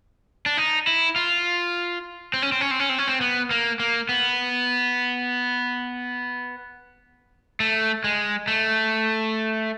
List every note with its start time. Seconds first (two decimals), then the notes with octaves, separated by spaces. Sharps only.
0.46 D4
0.57 D#4
0.87 E4
1.16 F4
2.34 C4
2.42 C#4
2.52 C4
2.61 C#4
2.71 C4
2.79 C#4
2.89 C4
2.98 C#4
3.08 C4
3.21 B3
3.51 A#3
3.80 A#3
4.09 B3
7.60 A3
8.04 G#3
8.48 A3